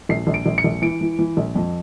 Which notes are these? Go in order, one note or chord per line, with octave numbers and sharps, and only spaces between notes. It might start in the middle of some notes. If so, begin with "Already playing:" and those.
A#1 C7
A#1
D7
A#1
C#7
A#1
E3 D7
E3
E3
A#1
F2